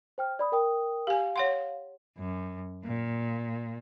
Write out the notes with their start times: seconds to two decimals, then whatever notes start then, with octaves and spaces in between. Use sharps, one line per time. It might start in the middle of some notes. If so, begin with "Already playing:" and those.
0.18 C5 G5 F6
0.39 D5 B5 D#6
0.52 A#4 G5 D#6
1.07 G4 F5 G#5
1.36 C#5 F#5 C6
2.18 F#2
2.84 A#2